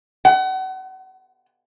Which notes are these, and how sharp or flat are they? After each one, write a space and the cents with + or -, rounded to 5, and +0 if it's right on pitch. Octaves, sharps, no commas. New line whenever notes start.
F#5 +35